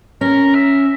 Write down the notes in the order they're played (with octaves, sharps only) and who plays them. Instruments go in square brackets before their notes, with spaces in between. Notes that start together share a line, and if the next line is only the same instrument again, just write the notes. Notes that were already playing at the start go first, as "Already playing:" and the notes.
[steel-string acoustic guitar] C#4 [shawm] A#4
[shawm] E5